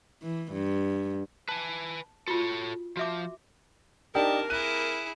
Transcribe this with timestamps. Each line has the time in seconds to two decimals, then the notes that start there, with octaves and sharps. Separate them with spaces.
0.22 E3
0.52 G2
1.49 B4 G#5 A5
2.28 F4 F#4 A4 C#5
2.97 F3 F#4 E5 D6
4.15 C3 A#3 D4 D#4 G4 A#4 A5
4.50 E4 G#4 F#6 D#7